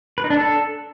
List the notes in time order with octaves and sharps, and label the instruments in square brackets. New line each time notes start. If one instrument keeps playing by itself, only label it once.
[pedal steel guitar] B4
D#4
D4
A4